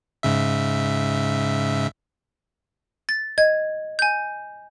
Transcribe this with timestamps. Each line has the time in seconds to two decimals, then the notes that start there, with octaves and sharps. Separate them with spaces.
0.23 G#2 C#3 E5
3.09 A6
3.38 D#5 G#6
3.99 G#5 G6